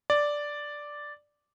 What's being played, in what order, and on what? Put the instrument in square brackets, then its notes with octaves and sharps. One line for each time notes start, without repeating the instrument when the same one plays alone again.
[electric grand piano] D5